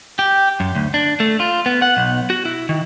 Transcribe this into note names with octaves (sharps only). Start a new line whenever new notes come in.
G4
F#2
D2
D4
A3
F4
B3
F#5
B1
F#4
E4
D#3